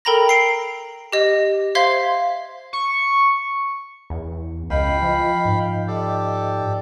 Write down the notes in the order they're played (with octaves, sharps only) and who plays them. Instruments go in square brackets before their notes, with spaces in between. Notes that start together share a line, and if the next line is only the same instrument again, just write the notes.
[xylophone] A4 A#4 G5 A#5 B5 A#6
C7 D7
G4 D#5
C5 E5 F5 C6 G#6
[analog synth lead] C#6
[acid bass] E2
[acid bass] C#2 [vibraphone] D#5 [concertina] F5 G5 B5
[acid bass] F3
[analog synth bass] G#2
[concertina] G4 A4 D5